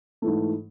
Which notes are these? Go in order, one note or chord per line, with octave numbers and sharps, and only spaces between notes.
G#2 E3 A3